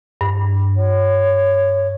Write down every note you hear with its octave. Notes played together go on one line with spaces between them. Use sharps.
G2
C#5